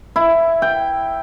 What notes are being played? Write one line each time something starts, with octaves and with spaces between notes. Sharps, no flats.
E4
G5